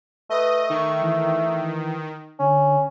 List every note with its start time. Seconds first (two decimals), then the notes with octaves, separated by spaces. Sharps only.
0.30 A3 B4 D#5
0.70 D#3 C#6
1.02 E3
2.39 D3 C#4